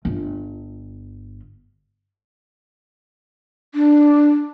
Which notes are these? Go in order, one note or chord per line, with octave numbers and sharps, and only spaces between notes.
G1 F4
D4